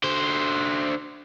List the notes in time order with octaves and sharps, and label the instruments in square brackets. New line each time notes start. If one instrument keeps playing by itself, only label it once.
[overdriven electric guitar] D3 C5